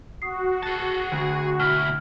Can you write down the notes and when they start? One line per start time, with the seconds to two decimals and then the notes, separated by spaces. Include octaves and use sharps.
0.22 F#4 D#6 C7
0.63 G#4 A5
1.12 D2
1.60 B2 E4 F6